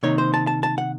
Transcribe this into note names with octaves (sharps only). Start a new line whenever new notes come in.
C3 D#3 A#3 D#4 C#5
C5
A5
A5
A5
F#5